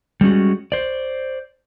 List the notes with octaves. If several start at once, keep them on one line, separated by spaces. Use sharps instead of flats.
G3 G#3 C#4 F#4
C5 D5